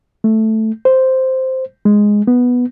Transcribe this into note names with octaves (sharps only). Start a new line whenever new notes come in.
A3
C5
G#3
B3